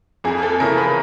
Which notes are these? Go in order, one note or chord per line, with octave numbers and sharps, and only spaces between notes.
F2 G#4
A4
C#3 E3 A#4
B4